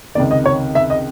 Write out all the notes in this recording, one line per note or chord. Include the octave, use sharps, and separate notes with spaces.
C#2 C3 D#3 D5
D#5
C#5
E5
D#5